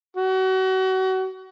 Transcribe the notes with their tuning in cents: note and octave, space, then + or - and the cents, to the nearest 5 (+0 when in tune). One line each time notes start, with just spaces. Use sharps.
F#4 +30